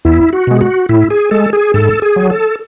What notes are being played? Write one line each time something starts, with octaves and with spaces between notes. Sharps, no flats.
E2 E4
F#4
B2 G#3
F#4
A2 E4
G#4
G#3 A4
G#4
G#2 A4
G#4
F#3
A4